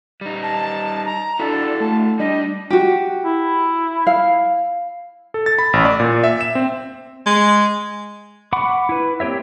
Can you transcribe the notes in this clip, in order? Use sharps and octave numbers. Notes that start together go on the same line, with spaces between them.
G3 D#4
A5
A#5
D4 E4 F#4 A4
A3 A5
G3 D4 D#5
F#4 G4
E4
F5
A4
A6
B5
A1
D5
A#2
E5
E7
C4
G#3
F#5 B5 C#6 D6
E4 B4
A#3 C4 G4 C#5 E5